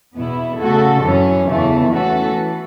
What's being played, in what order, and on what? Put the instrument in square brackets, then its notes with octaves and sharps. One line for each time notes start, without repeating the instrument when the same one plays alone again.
[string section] E2 B2 B3 E4
C#3 A3 F#4 A4
F#2 E3 C#4
E2 C#3 E3 A3
E3 A3 C#4 F#4 A4
E3